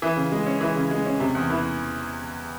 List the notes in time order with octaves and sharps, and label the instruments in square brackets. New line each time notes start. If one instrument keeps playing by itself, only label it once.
[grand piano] E3
C#3
G#3
C#4
E3
C#3
G#3
C#4
C3
E2
E3